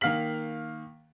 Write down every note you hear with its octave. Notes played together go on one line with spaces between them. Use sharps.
D#3 A#3 F5 F6 B6 F#7